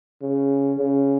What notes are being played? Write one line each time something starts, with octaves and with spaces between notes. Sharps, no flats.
C#3
C#3